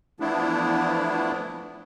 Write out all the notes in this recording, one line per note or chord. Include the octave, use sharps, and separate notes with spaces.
E3 F3 A3 B3 D4 E4